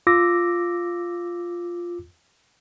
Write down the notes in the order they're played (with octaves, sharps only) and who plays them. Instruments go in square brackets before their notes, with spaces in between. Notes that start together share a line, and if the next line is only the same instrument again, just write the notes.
[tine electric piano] F4 D6 E6 A#6